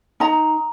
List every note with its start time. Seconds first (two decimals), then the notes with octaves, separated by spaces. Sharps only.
0.20 D#4 A#5